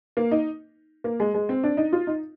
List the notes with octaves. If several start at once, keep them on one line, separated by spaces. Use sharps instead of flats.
A#3
D#4
A#3
G#3
G#3
C4
D4
D#4
F4
D#4